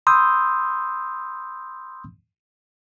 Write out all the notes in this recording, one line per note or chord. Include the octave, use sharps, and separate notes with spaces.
B5 C6 D#6 E6 G6